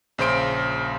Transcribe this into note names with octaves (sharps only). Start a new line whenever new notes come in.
A#1 C#3 C5 C6 D7